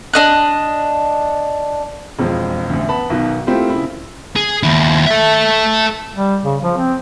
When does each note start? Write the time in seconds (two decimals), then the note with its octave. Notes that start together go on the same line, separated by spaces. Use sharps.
0.13 D4 D#5 F#6
2.19 E1 F2 F3 G#3
2.70 A1 D2
2.89 B3 A5 B5
3.10 B1 B2 D#3
3.47 A3 A#3 C4 E4 F4 G4
3.70 C#3 E4
4.36 G#4
4.63 D#2 E4
5.06 A4 E5
6.14 G3
6.44 C#3
6.63 F3
6.78 C4